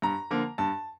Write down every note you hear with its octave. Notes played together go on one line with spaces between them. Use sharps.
G2 A#5
D3 F3 A#3
G2 A5